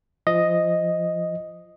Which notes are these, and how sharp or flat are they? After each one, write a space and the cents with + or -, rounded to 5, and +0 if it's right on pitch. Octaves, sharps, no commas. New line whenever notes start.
F3 -20 D#5 +0